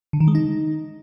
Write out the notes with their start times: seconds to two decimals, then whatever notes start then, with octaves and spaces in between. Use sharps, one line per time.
0.13 D3
0.20 D#3
0.28 G#3
0.35 D#4